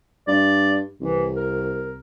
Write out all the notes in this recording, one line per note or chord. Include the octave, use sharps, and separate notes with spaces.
G2 D5
C2 E3
A#4